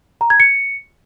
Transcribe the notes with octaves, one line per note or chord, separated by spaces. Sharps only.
A#5
G#6
C#7